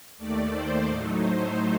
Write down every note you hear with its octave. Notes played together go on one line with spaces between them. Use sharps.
D#2 D#3 A3 D5
C5
A2 F#3 A3 D#4
C5